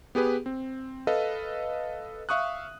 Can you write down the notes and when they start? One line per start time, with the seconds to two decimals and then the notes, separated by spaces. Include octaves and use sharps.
0.15 B3 G4 G#4 B4
0.46 C4
1.07 A4 B4 D#5 F5
2.29 E5 F5 C#6 D#6 F#6